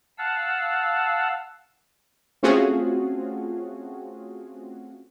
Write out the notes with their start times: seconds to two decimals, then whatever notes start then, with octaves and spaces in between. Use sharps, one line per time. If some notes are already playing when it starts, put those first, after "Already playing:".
0.18 F5 F#5 A5 E6
2.43 A3 C4 C#4 F4 F#4 G#4